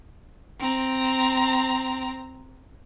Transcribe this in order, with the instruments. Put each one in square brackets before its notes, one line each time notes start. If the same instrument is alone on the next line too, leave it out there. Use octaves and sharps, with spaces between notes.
[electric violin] C4 A#5